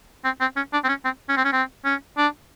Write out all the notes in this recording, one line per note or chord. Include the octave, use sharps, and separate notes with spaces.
C4
C4
C#4
D4
C4
C#4
C4
C#4
C4
C#4
C4
C#4
D4